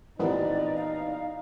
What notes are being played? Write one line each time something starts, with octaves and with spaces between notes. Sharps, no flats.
A1 A#2 B3 C4 D#4 D5
F5